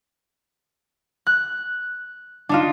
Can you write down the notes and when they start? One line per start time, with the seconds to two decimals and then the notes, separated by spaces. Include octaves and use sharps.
1.27 F#6
2.49 D4 D#4 F4